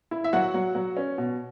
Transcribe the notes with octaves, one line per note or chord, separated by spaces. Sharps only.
E4
E5
F#3 F#4 F#5
F#3
F#3
C#4
B2